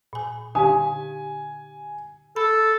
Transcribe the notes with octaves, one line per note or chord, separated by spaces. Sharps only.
A#2 G#5
D3 D#4 G4 F5 G#5
A4 B5